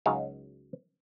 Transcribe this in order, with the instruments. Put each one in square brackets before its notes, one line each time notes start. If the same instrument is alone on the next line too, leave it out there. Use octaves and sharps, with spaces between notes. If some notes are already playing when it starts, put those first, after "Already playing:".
[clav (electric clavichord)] C#2 F#3 D#4 F#4 G#4 F5